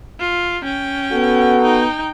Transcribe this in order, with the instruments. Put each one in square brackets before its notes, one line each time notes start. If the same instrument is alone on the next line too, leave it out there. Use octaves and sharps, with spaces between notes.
[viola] F4
C#4 G5
[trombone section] B3 F#4 A4
[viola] D#4 G5